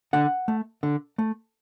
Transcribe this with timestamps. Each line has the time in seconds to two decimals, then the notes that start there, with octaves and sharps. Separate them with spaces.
0.13 D3 F#5
0.48 A3
0.83 D3
1.18 A3